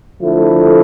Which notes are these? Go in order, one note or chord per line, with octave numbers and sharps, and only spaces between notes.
D3 F3 A3 E4 A4